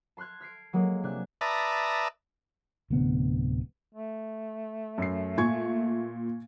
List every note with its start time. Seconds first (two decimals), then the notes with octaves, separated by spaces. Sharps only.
0.17 A5 C6 F6 F#6 G#6
0.40 F6 B6 C7 D7
0.73 F#3 G#3 A#3 C#5
1.03 C3 D4 G#5 F#6
1.41 B4 D5 E5 A5 A#5 D#6
2.90 D1 D2 C3 B3
3.95 A3
4.98 F#2 C7
5.38 A#2 G#5 C#6 G#6